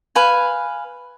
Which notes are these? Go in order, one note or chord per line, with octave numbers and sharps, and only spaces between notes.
B4 F5 G#5